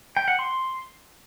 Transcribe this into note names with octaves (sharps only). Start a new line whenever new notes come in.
G5
F#5
C6